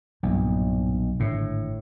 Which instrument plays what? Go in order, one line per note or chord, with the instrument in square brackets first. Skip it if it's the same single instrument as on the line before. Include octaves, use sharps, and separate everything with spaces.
[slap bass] B1 [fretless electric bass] G2 A#2
[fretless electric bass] G#1 D3 [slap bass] A2